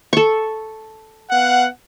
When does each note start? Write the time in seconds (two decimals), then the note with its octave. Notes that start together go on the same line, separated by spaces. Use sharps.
0.13 A4 C#6
1.30 B3 F5 F#5